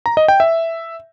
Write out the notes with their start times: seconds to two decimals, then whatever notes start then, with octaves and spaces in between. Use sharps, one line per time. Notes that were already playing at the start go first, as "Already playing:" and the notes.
0.06 A#5
0.17 D#5
0.28 G5
0.40 E5